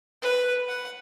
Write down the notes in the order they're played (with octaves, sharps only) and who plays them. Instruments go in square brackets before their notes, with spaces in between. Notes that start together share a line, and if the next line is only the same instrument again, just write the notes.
[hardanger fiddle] B4
F#5